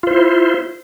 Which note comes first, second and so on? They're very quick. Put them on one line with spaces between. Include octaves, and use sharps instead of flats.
F4 C5 E4